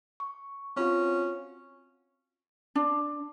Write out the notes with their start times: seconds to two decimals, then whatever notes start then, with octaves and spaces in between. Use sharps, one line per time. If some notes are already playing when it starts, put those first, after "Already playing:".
0.20 C#6
0.76 C4 C#4 F4 F#4
2.75 D4